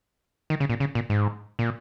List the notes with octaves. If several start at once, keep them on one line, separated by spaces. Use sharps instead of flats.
D#3
C#3
A#2
C#3
A#2
G#2
A#2